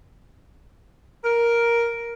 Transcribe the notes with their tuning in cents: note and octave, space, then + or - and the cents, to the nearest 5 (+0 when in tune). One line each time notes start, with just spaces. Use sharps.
A#4 +5